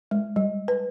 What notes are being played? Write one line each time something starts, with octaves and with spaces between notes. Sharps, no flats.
G#3
G3
B4